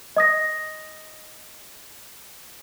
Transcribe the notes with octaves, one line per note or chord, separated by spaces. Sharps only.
D#5 D#6 A#6